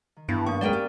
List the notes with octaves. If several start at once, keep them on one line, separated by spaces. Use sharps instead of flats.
D#3
G2 E3 B3
F#2 A#3 C#6
F#3 G#3 C#4 A#4 B4 D5 G5
G4